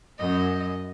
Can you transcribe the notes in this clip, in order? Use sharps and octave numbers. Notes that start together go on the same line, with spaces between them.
F#2 D#5